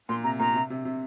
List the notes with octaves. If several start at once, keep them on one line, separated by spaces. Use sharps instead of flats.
A#2 C6
C3 A#5
A#2 A#5
C3
C3
C3